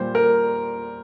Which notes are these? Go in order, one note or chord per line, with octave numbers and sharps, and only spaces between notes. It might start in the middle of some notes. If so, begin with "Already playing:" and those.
Already playing: A#2 G3 C5
A#4